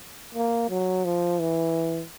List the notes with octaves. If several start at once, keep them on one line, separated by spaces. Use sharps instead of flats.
A#3
F#3
F3
E3